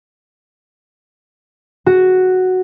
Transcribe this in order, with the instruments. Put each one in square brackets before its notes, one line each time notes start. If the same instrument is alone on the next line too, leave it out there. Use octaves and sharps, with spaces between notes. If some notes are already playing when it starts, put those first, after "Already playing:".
[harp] F#4